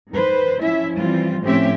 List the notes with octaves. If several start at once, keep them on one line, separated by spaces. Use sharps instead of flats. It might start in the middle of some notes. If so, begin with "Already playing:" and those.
D#3 B4 C5
F3 C#4 E4 E5
E3 G3 C4 F4
A2 F3 C4 C#4 G4 E5